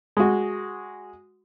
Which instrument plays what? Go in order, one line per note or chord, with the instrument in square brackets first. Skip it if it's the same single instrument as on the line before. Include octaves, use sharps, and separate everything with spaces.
[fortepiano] G#3 F#4